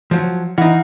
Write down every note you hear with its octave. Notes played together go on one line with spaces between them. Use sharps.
F3 F#3
E3 D#4 E4 F#5